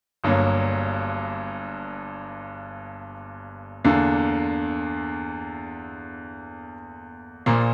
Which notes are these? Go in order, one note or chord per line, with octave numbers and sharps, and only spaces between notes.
G1 G2 F#3 A#3
E2 D3 A#3
A#1 A#2 A#3